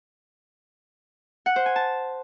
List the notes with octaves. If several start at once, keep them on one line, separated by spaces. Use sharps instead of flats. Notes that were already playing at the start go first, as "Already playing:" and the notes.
F#5
C5
G#5
A5